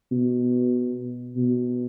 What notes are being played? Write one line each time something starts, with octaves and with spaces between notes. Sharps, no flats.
B2
B2